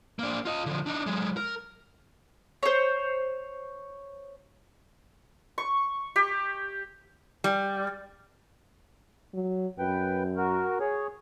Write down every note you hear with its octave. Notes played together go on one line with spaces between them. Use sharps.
A#3 D4
F4 D#5
D3 F3
D4 D#4
F#3 G#3
A#4
C5 C#5
C#6
G4
G3
F#3
F#2 B4 G5
F#4 A#4
G#4 C#5